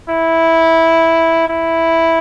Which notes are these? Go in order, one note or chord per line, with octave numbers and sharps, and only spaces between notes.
E4
E4